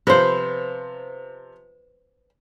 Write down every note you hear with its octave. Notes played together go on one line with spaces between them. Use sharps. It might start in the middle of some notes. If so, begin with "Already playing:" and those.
C3 F3 B4 C5